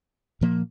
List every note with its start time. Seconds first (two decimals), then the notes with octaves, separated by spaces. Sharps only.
0.41 A#2 F3 A#3